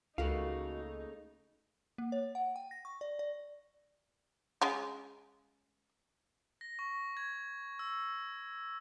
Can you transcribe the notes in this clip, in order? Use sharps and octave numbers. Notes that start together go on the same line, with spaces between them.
C#2 C#3 A3 A#3 D#4 F#4 F5
A#3
C#5
F#5
G5
A#6
C#6
D5
D5
G#3 C#4 F4
A#6
C#6
G#6
E6